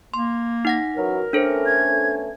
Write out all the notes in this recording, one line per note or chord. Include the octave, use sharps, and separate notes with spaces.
A#3 C6
D#4 F#5 A#6
F#2 E3 F#3 A#4
A3 B3 C#4 D4 A4 C5
G#6